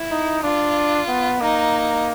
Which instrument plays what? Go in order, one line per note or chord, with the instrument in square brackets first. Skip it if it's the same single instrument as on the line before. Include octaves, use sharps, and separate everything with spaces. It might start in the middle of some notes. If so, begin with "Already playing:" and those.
Already playing: [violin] E4
[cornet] D#4
[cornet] D4 [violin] F4
[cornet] B3
[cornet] A#3 [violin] D#4